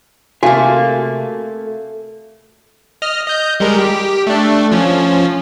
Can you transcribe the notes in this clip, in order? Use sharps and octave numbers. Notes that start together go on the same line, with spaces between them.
C3 A3 A#3 F#4 F5 G#5
D#5 F6
D#5 G6
G3 G#3 A#4
G4
A3 D4
F3 C#4